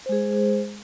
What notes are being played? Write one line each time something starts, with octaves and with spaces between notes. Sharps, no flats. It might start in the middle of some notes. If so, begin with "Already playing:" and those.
G#3 G#4 C5